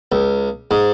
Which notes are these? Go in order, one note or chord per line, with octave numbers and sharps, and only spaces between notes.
C#2
G#2